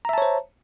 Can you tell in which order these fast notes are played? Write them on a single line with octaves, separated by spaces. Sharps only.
A#5 E5 A5 C#5 C5